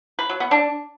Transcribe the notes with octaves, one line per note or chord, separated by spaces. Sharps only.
B4
F#3
B3
D4